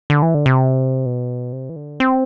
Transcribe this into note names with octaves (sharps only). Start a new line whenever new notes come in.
D3
E3
D3
C3
B2
C3
E3
D3
C4